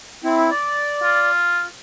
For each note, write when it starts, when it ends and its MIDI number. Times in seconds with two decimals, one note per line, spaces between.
0.24 0.50 60
0.24 0.50 64
0.51 1.31 74
1.02 1.64 65